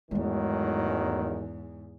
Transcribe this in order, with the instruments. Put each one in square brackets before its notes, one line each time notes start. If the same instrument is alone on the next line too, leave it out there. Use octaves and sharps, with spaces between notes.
[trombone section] A1 D#3 F#3 [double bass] E2 G#2 [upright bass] G#3 A3